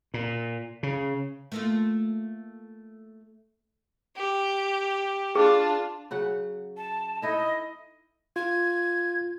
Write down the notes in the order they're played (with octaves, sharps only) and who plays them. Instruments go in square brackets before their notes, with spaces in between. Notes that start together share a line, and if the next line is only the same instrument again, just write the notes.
[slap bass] A#2
C#3
[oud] A3 A#3 F4
[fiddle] G4
[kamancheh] D4 F4 [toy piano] G#4
[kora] C#3 F#3 F#5
[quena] A5
[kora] D#4 E4 A4 [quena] D#5
[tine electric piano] F4 [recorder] G#6